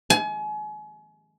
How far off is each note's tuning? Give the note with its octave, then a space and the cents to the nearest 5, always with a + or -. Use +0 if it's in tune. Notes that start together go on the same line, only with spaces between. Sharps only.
G#5 +35